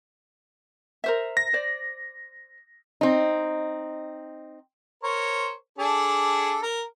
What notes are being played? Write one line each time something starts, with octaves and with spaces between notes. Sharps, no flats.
A#4 C5 E5
A#6
C5 D5
C4 D#4
A#4 C5 C#5
D4 G#4 A4
A#4